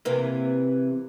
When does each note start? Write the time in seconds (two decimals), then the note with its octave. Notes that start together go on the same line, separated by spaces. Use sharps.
0.05 C3 E3 A#3